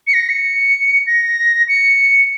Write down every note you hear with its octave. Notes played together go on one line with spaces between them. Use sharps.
C#7
A#6
C#7
A#6
C#7